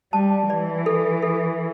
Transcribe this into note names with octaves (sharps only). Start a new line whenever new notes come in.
G3 A5
E3 D5
A4
A4